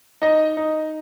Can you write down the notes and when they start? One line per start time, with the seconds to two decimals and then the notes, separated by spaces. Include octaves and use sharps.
0.22 D#4 D#5
0.57 D#4